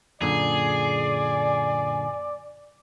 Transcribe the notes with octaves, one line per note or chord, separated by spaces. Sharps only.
F#2 A#2 D3 G#4 D5